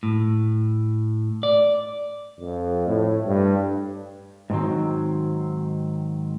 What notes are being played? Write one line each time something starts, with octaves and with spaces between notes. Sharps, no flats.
A2
D5
F2
A2
G2
G#2 D3 D#3 F#3 C4